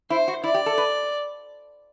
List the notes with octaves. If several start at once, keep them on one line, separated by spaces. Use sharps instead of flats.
E4 C5
F#4
E4 D5
G4
A4
B4